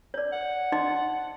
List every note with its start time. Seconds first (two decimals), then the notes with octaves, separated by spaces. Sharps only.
0.14 C#5 D5
0.32 F#5
0.72 D#4 D#5 C6